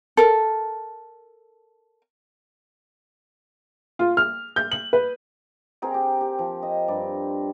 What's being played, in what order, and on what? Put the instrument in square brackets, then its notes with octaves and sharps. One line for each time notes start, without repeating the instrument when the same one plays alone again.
[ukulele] A4 A#4
[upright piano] F4
F6
G6
F#7
B4
[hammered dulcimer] C4 G#4 A#4 G5
G4
G4
F3
D#5
G2 D5